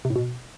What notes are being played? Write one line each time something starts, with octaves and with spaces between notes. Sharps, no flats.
C3
A2
B2